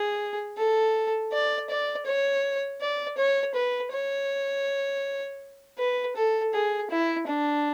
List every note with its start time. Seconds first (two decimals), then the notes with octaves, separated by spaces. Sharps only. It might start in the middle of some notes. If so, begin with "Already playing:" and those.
Already playing: G#4
0.57 A4
1.32 D5
1.70 D5
2.06 C#5
2.81 D5
3.18 C#5
3.55 B4
3.92 C#5
5.78 B4
6.16 A4
6.54 G#4
6.91 E4
7.27 D4